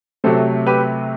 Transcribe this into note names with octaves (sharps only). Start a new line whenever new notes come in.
C3 F#3 A3 A4 C5
G4 B4